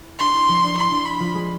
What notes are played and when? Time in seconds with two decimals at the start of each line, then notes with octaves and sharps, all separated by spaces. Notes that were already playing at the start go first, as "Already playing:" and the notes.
Already playing: E4
0.19 D4 C6
0.34 E4
0.48 F3 F4
0.63 D4
0.77 E4 C6
0.91 D4
1.06 B5
1.20 F3 F4
1.34 G#3 G#4